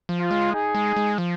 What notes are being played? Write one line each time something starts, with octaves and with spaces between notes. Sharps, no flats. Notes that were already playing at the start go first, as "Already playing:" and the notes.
F3
F4
G#3
D#4 G#4
G#3
G#3
F3